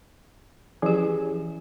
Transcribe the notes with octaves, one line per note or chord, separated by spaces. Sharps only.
E3 F3 C#4 G4 G#4